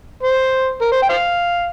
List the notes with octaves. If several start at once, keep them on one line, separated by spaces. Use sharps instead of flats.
C5
A#4
C5
G5
C5 F5